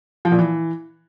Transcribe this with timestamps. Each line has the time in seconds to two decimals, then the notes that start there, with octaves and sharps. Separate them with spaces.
0.25 F3
0.32 A#2
0.39 E3